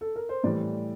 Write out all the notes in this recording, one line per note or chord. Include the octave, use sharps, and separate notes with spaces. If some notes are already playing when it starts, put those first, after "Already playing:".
A4
A#4
C5
A2 E3 G3 D5